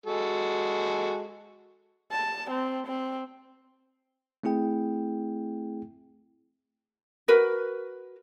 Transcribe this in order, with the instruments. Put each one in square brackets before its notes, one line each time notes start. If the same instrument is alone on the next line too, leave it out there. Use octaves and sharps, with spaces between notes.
[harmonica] G#3 F#4 A4
[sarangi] A5
C4
C4
[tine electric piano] A3 C4 E4 G#4 G5
[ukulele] F#4 A#4 B4